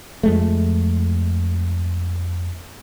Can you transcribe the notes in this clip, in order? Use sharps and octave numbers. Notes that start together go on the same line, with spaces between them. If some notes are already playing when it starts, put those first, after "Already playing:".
F2 G#3 A3